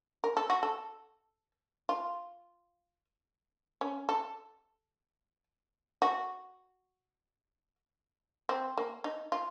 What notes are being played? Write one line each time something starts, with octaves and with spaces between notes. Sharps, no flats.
A#4
A4
F#4
A4
F4
C#4
A4
F#4
C4
A#3
D#4
F4